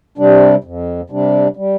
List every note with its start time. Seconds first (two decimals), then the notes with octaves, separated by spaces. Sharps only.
0.18 C3 G3 D4
0.64 F2
1.10 C3 G3 D4
1.56 G3